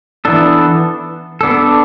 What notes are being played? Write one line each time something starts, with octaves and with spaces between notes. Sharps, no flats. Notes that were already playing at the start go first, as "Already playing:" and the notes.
E3 B3 D4 A4
B3 D4 A4